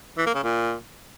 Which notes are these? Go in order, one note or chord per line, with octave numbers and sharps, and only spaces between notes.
E3
A#3
C#3
A#2